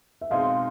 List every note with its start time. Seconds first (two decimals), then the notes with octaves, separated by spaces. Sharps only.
0.21 E5
0.30 B2 G#3 C4 D#4 D#5 F5